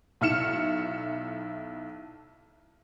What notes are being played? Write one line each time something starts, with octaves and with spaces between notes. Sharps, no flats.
B1 E4 F6 C#7 E7